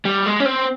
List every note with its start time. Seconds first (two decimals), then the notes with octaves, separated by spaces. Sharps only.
0.05 G3
0.26 G#3
0.40 C#4
0.45 C4